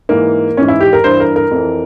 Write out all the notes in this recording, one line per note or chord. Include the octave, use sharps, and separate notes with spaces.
G#2 E3 A#3
G#2 E3 C#4
E4
G4
A#4
G2 E3 C5
A#4
A#4
F2 E3